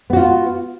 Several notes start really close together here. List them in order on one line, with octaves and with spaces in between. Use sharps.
B3 F#4 F4